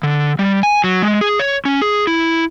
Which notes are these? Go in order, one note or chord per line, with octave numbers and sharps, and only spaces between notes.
D3
G3
G#5
F#3
G#3
G#4
C#5
C#4
G#4
E4